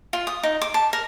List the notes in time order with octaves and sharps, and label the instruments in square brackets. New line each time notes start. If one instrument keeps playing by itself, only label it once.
[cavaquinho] F4
D#6
D#4
D6
A5
A#4